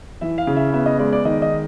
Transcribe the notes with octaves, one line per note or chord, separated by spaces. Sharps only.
E3 E5
F5
C#3
E5
B3 E5
D#5
G#3 D5
D5
D#3 D#5
D#5